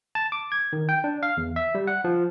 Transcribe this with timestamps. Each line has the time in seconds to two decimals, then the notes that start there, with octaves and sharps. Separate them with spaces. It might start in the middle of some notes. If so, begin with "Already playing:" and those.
0.15 A5
0.32 D6
0.52 G#6
0.73 D#3
0.89 G5
1.04 D4
1.23 F5
1.37 E2
1.56 E5
1.75 G3
1.87 F#5
2.04 F3